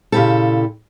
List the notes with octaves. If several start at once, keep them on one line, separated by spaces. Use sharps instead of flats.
A#2 C#3 F#3 E4 G4 A4